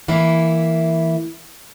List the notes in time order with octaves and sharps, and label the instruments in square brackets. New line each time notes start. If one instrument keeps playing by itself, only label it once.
[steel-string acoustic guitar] E3 A#3 E4